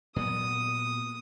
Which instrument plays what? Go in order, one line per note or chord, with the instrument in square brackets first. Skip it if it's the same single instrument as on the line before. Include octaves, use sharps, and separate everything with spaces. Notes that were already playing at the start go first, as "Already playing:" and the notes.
[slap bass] A#2 F#3 B3 [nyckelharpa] D#6